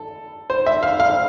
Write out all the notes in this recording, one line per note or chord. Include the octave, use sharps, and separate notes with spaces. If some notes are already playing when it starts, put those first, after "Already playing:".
Already playing: A4
C5
E5
F5
F5